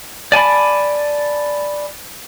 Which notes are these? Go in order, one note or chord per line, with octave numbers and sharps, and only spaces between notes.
D5 G#5 A5 B5